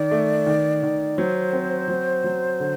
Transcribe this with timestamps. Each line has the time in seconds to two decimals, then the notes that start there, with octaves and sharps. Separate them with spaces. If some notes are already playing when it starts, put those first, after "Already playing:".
Already playing: D#3 D5
0.11 A3
0.46 D#3
0.83 D#3
1.18 F#3 C5
1.53 C4
1.88 F#3
2.24 F#3
2.60 D3